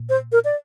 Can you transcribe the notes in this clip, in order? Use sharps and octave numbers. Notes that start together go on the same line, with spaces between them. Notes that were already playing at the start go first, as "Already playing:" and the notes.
Already playing: A#2
C5
A#4
D5